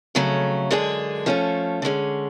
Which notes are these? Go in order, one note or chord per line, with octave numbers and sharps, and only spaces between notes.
F2 C#3 F#3 A3 C#4
F#2 D3 G#3 D4 G#4
F3 A3 C#4 F4 A4
D3 G#3 C#4